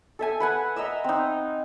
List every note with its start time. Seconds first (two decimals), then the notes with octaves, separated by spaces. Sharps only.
0.19 A4 E5 G#5
0.40 B4 F#5 G#5
0.76 D#5 E5 A#5 E6
1.04 C4 D#4